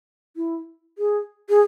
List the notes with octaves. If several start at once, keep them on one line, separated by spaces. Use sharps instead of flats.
E4
G#4
G#4